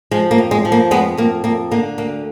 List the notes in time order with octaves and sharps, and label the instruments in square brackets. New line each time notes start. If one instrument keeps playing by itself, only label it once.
[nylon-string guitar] F3 G#3
A#3
F2
G#3
F3
A#3
F2 G#3 B3
F2 A#3
F2 A#3
D3 A#3
D2 A#3